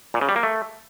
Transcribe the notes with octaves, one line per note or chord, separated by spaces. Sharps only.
A#2
C#3
G3
A#3
A3